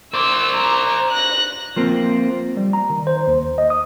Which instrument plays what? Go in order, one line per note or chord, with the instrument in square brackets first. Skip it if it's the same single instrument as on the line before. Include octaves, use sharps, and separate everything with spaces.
[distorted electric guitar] C5 D5 [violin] E6
[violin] A#5
F#6 A#6
[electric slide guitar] F3 A#3 C4
[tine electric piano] G3
A#5
D#3
C5
D#2
D#5
D#6